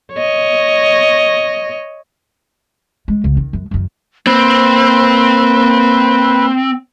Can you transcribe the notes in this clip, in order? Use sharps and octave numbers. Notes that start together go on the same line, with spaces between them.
C#5 D#5
G#3
C#2
D#3
F#2
F#2 D#3
A#3 C4 B4